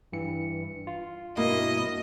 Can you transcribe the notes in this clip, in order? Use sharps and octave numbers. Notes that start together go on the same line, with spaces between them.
G2 E3 C#7
F4
G2 B2 A#3 E4 D#5